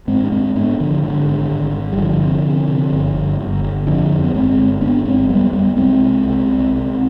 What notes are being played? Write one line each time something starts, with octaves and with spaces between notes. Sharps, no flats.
G#2 G#3 C4
D4
G#2 G#3 C4
G#2 B3 D4
G#1 D3 F3
G#2 D3
G#1
G#1
G#2
G3
G1 D3 F3
C3
C3
C3
G1
G1
G1
G1
F2 D3 F3
F2
B3
G1 G#3 C4
G1
G1 B3 D4
G1 G#3 C4
F2 G3 B3
F2 G3 B3
C2 G#3 C4
C3
C2
C2
C2